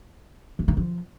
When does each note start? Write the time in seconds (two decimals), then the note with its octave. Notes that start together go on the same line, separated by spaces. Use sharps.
0.59 E3
0.68 D#3
0.77 F3